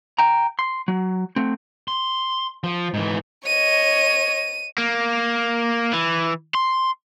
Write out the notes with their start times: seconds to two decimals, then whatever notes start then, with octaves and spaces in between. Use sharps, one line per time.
0.18 G5 A#5
0.59 C6
0.88 F#3
1.36 A3 C4
1.88 C6
2.64 F3
2.94 G#2 E3
3.47 C#5 D#5 D#7
4.78 A#3
5.93 E3
6.55 C6